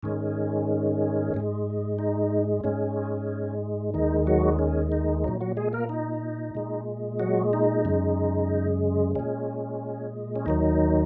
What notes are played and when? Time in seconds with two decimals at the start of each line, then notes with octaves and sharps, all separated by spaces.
0.03 G#2 D#3 G#3 C#4
1.34 G#2 G#3
1.99 D#4
2.64 G#2 G#3 C#4
3.94 D#2 D#3 G#3 D#4
4.27 F#3 F#4
4.59 C#4
4.92 D#4
5.24 A#2 F#3 D#4
5.41 F#3 F#4
5.57 G#3 G#4
5.73 A#3 A#4
5.89 D#4
6.55 A#2 G#3
7.20 F#3 F#4
7.53 D#4
7.85 F#2 C#3 G#3
9.15 A#2 G#3 C#4
10.36 C#4
10.46 D#2 D#3 F#3 D#4